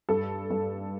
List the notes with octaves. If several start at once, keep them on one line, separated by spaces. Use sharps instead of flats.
G2 A4
G2